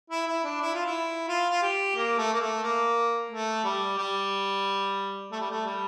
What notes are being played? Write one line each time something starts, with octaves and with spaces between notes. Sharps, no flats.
E4
E4
D4
E4
F4
E4
F4
F4
G4
A#3
A3
A#3
A3
A#3
A3
G3
G3
A3
G3
A3
G3